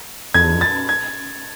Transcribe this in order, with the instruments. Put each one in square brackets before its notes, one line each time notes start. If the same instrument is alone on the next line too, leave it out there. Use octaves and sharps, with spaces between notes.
[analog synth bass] F2 [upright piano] G#6
[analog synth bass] E2
F2
[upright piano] A6
G#6